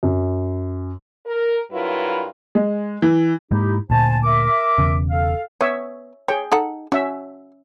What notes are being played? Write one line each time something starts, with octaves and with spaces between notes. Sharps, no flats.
F#2
A#4
G2 F#3 E4 F4 A#4 B4
G#3
E3
G#2 G#3 A#3 D#4 E4 G4
D2 A#2 C5 G#5 A5
A#4 E5 D6
E1 E2 C#3
A4 F5
B3 C#5 E5
G#4 C#5 G5
D#4 A4 F#5
C#4 F#4 E5